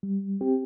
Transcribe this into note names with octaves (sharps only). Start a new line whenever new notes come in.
G3
C4 G4